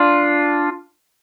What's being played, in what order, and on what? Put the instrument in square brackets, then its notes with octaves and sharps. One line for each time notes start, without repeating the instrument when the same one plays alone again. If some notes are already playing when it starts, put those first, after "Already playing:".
Already playing: [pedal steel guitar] D4 F4